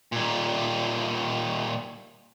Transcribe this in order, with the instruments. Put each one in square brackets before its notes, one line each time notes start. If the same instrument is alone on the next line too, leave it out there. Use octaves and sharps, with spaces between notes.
[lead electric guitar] A#2 G3